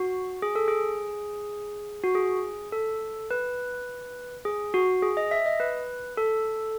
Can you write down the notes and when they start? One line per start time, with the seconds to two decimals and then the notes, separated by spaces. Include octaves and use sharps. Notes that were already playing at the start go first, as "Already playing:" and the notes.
Already playing: F#4
0.42 G#4
0.56 A4
0.68 G#4
2.04 F#4
2.15 G#4
2.72 A4
3.31 B4
4.45 G#4
4.74 F#4
5.02 G#4
5.17 D#5
5.31 E5
5.46 D#5
5.60 B4
6.17 A4